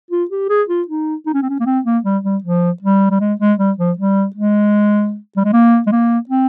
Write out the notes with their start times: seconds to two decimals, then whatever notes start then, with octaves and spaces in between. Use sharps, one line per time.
0.11 F4
0.31 G4
0.49 G#4
0.69 F4
0.88 D#4
1.26 D#4
1.34 C#4
1.42 C4
1.49 C#4
1.60 A#3
1.66 C4
1.85 A#3
2.04 G3
2.24 G3
2.43 F3
2.82 G3
3.11 G3
3.20 G#3
3.40 G#3
3.58 G3
3.78 F3
3.98 G3
4.36 G#3
5.37 G3
5.44 G#3
5.53 A#3
5.87 G#3
5.92 A#3
6.29 C4